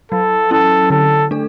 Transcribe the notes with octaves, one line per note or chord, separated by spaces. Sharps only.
F#3 A4
C#4 E4 A4
D3 A4
A3 D4 A4